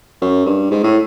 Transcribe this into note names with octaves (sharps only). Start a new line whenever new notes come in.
F#2
G2
G#2
A2